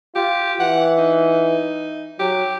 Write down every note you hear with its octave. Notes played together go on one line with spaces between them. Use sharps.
F4 G4
E3 F#5
D#4
F#3 G4